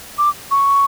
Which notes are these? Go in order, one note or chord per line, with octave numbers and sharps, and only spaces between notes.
D6
C#6